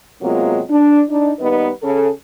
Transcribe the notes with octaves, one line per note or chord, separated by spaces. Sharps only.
C3 F#3 G#3 A#3 B3 F4
D4
D4 D#4
D#2 G3 B3 D#4 B4 D#5
C#3 A4